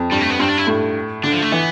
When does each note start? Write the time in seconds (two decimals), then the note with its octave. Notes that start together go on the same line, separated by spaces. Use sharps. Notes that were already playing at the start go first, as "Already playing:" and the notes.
Already playing: F2
0.11 G2 G3
0.21 A3
0.30 B3
0.39 G2 C4
0.49 D4
0.58 E4
0.67 A2
1.24 D3 D4
1.33 F3
1.42 A3
1.51 E3 B3